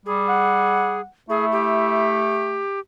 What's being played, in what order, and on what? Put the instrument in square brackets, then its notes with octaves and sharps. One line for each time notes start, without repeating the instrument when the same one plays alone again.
[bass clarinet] G3 [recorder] G#4
[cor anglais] F#5
[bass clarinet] A3 [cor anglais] E4 [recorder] G#4
[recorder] G4